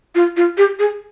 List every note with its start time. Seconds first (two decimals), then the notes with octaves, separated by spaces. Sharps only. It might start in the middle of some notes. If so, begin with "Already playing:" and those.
0.15 F4
0.37 F4
0.58 G4
0.79 G#4